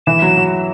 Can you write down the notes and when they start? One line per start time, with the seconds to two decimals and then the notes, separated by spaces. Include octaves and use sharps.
0.06 E3 E7
0.22 F#3
0.37 F#3